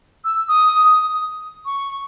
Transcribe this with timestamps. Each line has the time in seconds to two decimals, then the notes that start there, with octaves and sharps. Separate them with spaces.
0.25 E6
0.48 D#6
1.65 C#6